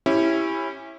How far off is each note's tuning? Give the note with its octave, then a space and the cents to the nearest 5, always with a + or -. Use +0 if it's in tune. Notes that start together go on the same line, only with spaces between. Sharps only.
C#4 -20 E4 +0 G4 +0